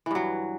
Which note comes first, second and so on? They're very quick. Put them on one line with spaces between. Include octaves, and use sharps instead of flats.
E3 G2 F#3